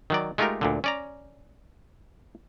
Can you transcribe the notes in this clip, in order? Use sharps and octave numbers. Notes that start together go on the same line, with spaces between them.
D#3 F#3 D5
G#3 A3 D#4 F4 G4 A#4
D2 A#2 D3
C#4 D5 A#5